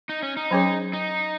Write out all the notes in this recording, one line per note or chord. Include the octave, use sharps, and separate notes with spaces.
D#4
C#4
D#4
F#3 C#4 G#4 C#5
D#4